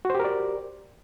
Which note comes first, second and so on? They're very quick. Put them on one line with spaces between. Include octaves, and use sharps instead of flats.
F#4 C5 G4 A#4 D5